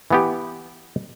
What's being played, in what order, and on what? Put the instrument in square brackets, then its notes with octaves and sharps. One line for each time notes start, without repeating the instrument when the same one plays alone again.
[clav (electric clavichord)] E3 B3 G4